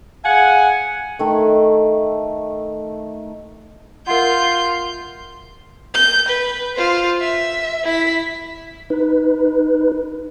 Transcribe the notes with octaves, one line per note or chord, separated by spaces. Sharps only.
G#4 F5 F#5 G#5
D#3 A3
F4 A#4 E5 F#5 C6 G6
G6
B4
F4 C5
E5
E4 B6
D#4 B4